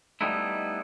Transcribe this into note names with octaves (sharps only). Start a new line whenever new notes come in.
G3 A3 B3 D#4 E4